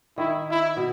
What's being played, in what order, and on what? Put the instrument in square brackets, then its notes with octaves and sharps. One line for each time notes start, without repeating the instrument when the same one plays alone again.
[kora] D#3 [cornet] E4
[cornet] E4
[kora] B2